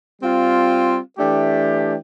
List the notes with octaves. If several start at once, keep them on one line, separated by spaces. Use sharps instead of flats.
G3 C4 F4
E3 A3 D4 G4